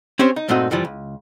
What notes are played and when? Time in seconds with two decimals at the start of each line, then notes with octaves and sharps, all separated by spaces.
0.19 C4 C#4 G4 C5 C#5
0.36 D#4
0.48 G2 A#2 A3 C4 D#4 F#4
0.71 F#2 E3 F3 G3
0.85 C#2